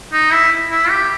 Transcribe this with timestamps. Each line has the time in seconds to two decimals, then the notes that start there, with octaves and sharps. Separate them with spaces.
0.13 D#4
0.31 E4
0.72 E4
0.90 G4